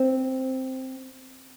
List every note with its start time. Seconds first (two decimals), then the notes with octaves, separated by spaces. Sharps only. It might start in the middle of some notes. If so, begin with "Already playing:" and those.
Already playing: C4